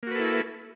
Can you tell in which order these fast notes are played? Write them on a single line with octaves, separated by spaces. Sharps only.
A#3 F#4 B4 A4 E4